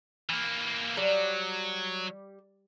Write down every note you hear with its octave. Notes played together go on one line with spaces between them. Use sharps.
E3 A#3
F#3 G3